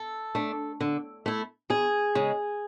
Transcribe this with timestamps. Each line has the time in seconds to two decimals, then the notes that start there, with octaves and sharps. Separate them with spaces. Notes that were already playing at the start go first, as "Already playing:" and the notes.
Already playing: A4
0.35 A3 D4
0.80 D3
1.26 A3 E4
1.70 E2 G#4
2.15 C#3 G#3